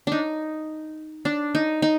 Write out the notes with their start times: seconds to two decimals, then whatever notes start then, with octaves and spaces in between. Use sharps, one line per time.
0.07 D4 D#4
1.25 D4
1.55 D#4
1.82 D#4